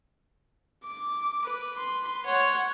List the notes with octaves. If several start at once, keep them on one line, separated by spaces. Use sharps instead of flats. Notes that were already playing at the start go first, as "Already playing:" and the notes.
D6
B4
C6
C#5 F#5 C6